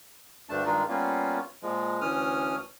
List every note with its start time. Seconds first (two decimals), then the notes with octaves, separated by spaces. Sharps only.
0.49 D2 G2 A3 D4 A5
0.65 G2 D#3 G#3 D4 D#4 F4
0.89 G3 A#3 B3 C#4 F4
1.62 A#2 F3 G#3
2.01 D2 E3 C#4 D#6 F6